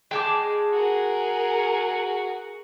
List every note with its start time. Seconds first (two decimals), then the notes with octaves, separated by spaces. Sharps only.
0.11 G#3 G5 A5 D6
0.73 F#4 G#4 A#4